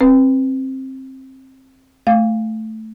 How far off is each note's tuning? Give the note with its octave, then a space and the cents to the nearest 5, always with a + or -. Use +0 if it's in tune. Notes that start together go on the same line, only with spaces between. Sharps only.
C4 +20 B4 +0
A3 +0 F5 +0